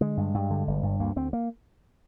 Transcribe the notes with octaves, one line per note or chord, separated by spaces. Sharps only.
D3 G#3
G2
G2
D3
G1
G2
D2 A#3
D2 C4
A#3